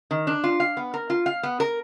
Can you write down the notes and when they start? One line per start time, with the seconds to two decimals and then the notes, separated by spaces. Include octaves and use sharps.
0.11 D#3
0.27 D4
0.44 F4
0.60 F5
0.77 B3
0.94 A#4
1.10 F4
1.26 F5
1.43 B3
1.60 A#4